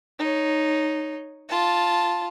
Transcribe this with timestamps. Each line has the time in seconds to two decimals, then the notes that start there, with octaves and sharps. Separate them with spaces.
0.19 D#4 C#5
1.49 F4 A5